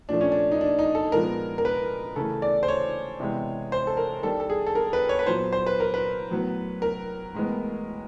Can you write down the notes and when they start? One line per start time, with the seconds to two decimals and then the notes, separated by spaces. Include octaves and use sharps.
0.09 A#2 F3 A3 D4
0.21 C#4
0.32 D4
0.52 D#4
0.61 D4
0.79 D#4
0.95 A4
1.12 A#2 F3 G#3 B3 A#4
1.58 A#4
1.65 B4
2.16 C#3 E3 A3 A4
2.42 D5
2.63 C5
2.68 C#5
3.20 C3 E3 G#3 B3
3.72 C5
3.87 A4
3.97 A#4
4.23 D#3 G3 A#3 A4
4.40 A4
4.50 G#4
4.67 A4
4.75 A#4
4.93 B4
5.09 C#5
5.19 B4
5.26 A#2 F#3 B3 C5
5.53 C5
5.66 B4
5.80 A#4
5.94 B4
6.30 A2 F#3 B3
6.82 A#4
7.34 A2 E3 G#3 B3